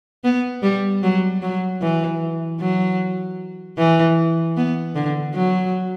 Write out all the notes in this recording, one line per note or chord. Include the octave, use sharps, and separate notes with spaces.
B3
G3
F#3
F#3
E3
F#3
E3
B3
D3
F#3